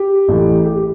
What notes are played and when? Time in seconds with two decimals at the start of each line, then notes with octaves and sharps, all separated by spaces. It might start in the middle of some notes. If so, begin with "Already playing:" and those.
Already playing: G4
0.28 A1 A2 E3 A3
0.66 G4